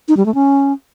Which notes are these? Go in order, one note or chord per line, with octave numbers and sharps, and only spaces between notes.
D#4
G3
A3
C#4